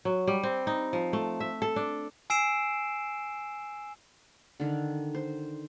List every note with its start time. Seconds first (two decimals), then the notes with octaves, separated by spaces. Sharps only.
0.05 F#3
0.27 G3
0.43 C4
0.67 D#4
0.93 F3
1.13 A3
1.40 E5
1.62 A4
1.76 D4
2.30 G#5 E6 C7 D7 E7
4.60 D3 D#3
5.15 C5